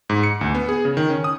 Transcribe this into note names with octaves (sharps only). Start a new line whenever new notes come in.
G#2
C#7
D2
B3
G#4
C#3
D#3
C#4
D#6